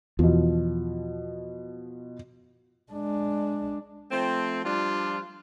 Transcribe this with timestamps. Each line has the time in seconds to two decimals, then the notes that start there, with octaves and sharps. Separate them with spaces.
0.19 E2 B2 F3
2.92 G#3 D4
4.10 F3 A3 C4
4.64 F3 G3 D4 F4